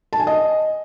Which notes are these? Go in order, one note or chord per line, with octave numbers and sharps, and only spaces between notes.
A5
G#5
D#5